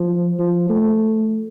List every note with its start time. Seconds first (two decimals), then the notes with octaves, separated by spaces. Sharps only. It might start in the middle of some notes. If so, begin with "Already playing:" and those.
Already playing: F3
0.39 F3
0.69 A3